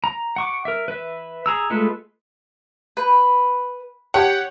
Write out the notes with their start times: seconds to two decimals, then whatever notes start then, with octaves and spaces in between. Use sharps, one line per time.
0.04 A#5
0.36 F#5 C#6 D6
0.65 A#4 E5
0.88 B4 E5
1.46 G#4 A#5 E6
1.70 G#3 A3 F4 A4 B4
2.97 B4
4.14 G4 C#5 F#5